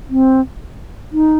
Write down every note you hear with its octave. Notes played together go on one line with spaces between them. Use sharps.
C4
D#4